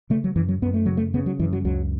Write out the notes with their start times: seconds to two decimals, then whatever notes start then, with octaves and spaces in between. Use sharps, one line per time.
0.10 C#3 A3
0.24 F#3
0.36 F#2 E3
0.49 F#3
0.62 F#2 B3
0.74 A3
0.86 C#3 F#3
0.97 A3
1.14 C#3 B3
1.26 F#3
1.40 F#2 E3
1.53 F#3
1.65 C#2 F#3